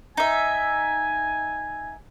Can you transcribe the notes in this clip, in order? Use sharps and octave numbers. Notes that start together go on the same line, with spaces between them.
D#4 E5 G#5